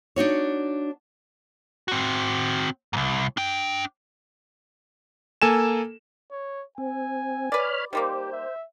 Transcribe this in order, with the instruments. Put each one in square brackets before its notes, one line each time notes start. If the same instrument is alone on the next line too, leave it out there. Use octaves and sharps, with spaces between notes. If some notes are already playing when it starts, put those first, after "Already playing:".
[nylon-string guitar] D4 D#4 F#4 C#5
[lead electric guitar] C4 F#4
C2 G#2
D4 G5
[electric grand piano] A#3 A4 G#5 E7
[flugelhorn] C#5
[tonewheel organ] C4 [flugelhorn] G#5
[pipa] B4 D5 [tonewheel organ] C#5 B5 F6
[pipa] D#3 G3 A#3 [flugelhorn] G4 [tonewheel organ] C5
[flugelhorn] E5